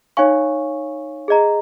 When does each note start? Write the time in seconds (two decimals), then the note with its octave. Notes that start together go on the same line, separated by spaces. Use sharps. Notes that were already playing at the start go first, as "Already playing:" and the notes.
0.17 D#4 C#5 F5 G#5 C#6
1.28 G#4 D#5 A#5